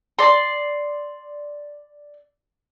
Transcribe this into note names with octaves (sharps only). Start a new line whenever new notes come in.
D5 C6